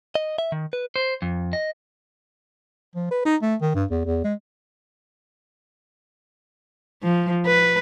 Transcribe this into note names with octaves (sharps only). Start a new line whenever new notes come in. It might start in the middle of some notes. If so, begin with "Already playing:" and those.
D#5
E5
D#3
B4
C5
F2
D#5
F3
B4
D#4
A3
D#3
G2
E2
E2
G#3
F3
B4